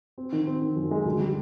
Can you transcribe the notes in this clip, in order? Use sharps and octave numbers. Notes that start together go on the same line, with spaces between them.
C4
D#3
C4
D#3
F#2
G#3
D2
G3